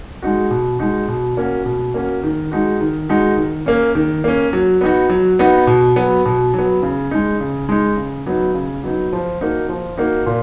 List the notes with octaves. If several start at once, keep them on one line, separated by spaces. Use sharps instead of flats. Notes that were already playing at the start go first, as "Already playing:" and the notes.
G#3 D#4 F#4
B2
G#3 D#4 F#4
B2
A#3 C#4 F#4
B2
A#3 C#4 F#4
D#3
G#3 D#4 F#4
D#3
G#3 D#4 F#4
D#3
A#3 C#4
D#3
A#3 C#4
F#3
B3 D#4 F#4
F#3
B3 D#4 F#4
B2
F#3 B3
B2
F#3 B3
C#3
G#3 D#4
C#3
G#3 D#4
C#3
F#3 B3 D#4
C#3
F#3 B3 D#4
F3
A#3 D#4 F#4
F3
A#3 D#4 F#4
A#2